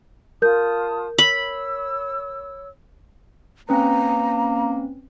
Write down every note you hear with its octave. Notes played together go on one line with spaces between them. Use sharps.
F4 A#4 A5 D#6 G6
C#5 B5 E6
A#3 C4 C#4 B4 A#5